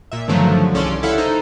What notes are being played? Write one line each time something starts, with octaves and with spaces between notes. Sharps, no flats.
A#2 E5
G2 D3 D#3 F3 F#3 A3
C2 C#3 C#4 A4 D5 C6
E4 A4 F5 F#5
D#4 A4 C5